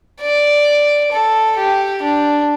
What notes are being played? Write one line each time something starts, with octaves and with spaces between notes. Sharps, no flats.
D5
A4
G4
D4